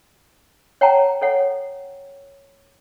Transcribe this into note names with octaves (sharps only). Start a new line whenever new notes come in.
C#5 F#5 G5 A5 A#5
A4 C#5 F#5